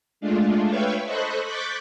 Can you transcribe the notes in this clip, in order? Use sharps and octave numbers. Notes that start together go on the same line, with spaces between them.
G#3 A3 D4 F4
B4 C#5 E5 F5 G5 C#6
A4 C5 D#5 B5 C#6 F#6
C#6 D6 F#6 G6 A6 B6